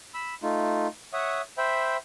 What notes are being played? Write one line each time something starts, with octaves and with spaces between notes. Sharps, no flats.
B5 E6
A3 D#4 F4
C#5 E5 F#5 D#6
C5 E5 G5 B5